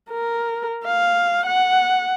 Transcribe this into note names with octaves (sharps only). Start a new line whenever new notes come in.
A#4
F5
F#5